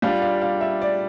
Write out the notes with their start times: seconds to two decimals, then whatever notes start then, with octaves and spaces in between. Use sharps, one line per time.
0.02 G3 D4 F4 F5
0.22 F5
0.42 F5
0.61 E5
0.81 D5